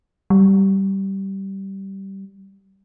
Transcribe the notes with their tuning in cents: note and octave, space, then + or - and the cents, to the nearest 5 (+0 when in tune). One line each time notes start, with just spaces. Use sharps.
G3 -15